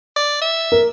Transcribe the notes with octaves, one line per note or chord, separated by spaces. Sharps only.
D5
E5
A#4